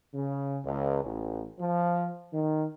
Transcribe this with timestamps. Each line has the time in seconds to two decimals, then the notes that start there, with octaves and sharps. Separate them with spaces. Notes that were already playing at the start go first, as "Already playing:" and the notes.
0.14 C#3
0.65 C#2
1.05 A1
1.60 F3
2.33 D#3